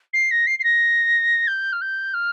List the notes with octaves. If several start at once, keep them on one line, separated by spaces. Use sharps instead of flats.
C7
A#6
C7
C7
A#6
G6
F6
G6
F6